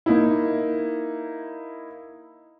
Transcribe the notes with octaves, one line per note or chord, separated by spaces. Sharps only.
A#3 D#4 E4